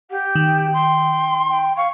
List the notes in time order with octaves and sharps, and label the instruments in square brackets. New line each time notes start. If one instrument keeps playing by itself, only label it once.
[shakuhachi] G4 [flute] F#5
[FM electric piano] D#3 [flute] G5
[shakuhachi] C6
[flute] G5
[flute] F5 [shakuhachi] C#6